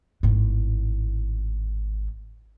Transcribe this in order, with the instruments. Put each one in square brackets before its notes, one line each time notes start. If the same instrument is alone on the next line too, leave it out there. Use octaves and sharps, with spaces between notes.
[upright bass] G#1 A2